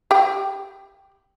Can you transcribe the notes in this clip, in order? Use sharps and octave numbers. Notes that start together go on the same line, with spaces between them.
G4 G5